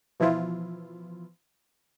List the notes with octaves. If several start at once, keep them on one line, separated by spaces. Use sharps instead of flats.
B2 E3 F3 E4 F4